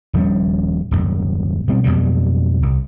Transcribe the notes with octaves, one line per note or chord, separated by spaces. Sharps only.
D#1 F3 G3 C#4
D#1 F#2
B2 G3 C4
F2 B2 F#3 G3
C2